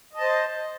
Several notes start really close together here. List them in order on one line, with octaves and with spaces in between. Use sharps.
D#5 A5 C5